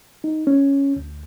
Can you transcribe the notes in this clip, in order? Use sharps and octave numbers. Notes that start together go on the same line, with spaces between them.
D#4
C#4
D2